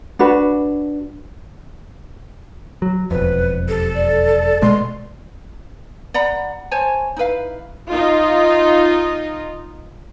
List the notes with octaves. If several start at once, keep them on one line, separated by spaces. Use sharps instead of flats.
D4 F#4 B4
F#3
E1 F2 B4
G4 A4
D5
B2 G#3 A3 C6
D5 F#5 A#5 B5
C5 C#5 G#5 A5
D#4 E4 B4 F5
D#4 F4